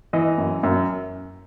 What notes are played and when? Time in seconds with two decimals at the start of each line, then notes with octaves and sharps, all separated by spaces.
0.13 E3 D#5
0.38 F#2
0.63 F#2